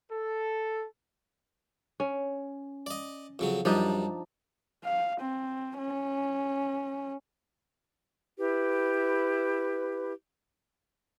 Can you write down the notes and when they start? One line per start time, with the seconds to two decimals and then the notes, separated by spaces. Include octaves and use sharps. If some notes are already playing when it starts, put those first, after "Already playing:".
0.12 A4
2.00 C#4
2.86 D5 D#5
3.39 F2 C#3 F#3
3.65 F#2 F3 G3 D4 D#4
4.84 F5
5.20 C4
5.78 C#4
8.38 E4 G4 B4